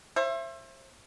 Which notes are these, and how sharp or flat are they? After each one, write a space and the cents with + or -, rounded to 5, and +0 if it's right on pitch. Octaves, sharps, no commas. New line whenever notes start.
C5 +40 E5 +25